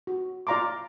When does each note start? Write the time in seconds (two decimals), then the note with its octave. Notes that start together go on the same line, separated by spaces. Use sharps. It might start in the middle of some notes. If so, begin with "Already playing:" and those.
0.07 F#4
0.47 F4 D5 F5 A#5 C6 D6